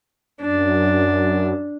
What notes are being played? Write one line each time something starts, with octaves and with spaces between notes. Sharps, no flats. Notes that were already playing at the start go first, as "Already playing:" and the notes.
F#2 D4